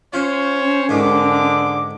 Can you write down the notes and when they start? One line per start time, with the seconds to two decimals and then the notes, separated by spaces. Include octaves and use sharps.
0.14 C#4 F4 C5 C#5
0.89 G#2 D3 D#3 G#3 D6